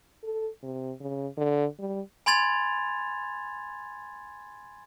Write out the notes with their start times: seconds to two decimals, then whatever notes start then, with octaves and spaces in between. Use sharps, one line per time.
0.23 A4
0.63 C3
1.01 C#3
1.37 D3
1.79 G3
2.26 G#5 B5 C6 G#6 A6 F7